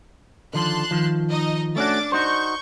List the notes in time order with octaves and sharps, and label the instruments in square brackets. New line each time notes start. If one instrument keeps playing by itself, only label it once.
[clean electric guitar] D3 D#3 F3 [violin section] A5 C6 F#6
[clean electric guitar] D#3 F3
[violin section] D#4 D#5
[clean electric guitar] A3 C#4 F#4 [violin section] D4 D6 A6
[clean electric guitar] D#4 F#4 C5 [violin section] C#6 G6